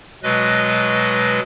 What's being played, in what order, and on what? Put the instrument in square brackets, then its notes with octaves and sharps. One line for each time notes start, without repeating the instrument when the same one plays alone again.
[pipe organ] B2 F#3 G#3 B4 D#5